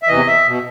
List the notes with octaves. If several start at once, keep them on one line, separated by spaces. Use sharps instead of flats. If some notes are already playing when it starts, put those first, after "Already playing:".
E5
E2 C3 E3 D#5
E5
B2